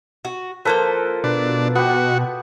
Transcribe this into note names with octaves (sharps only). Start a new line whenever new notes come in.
F#4
F3 A#3 F4 A4 B4 C5
B2 D4 B4
B3 F#4 G4